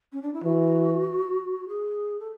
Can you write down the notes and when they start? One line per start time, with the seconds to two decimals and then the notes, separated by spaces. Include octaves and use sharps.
0.13 C#4
0.22 D4
0.34 E4
0.44 E3 F#4
1.68 G#4
2.20 A4